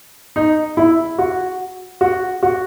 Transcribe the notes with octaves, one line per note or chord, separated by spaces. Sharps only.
D#4
E4
F#4
F#4
F#4